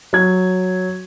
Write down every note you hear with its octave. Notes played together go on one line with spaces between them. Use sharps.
F#3 G#6